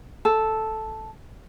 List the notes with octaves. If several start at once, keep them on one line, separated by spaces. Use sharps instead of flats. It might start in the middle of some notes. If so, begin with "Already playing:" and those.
A4